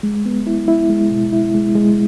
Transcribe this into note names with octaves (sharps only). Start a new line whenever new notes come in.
G#3
B3
E4
E4
G#3
B2
E4
G#3
G#3